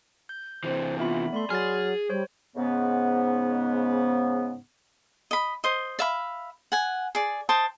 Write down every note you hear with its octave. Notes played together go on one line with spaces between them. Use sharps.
G6
C3 E3 C5
B3 F4 E5 B5
A3 D5 B5 C6
F#3 G#4 F6 A6
G3 C5 C#5
G#2 C#3 B3
D#5 B5
C5 D#5
D5 E5 F5 B5
F#5 G#5
G#4 D5
C5 G5 A5 D#6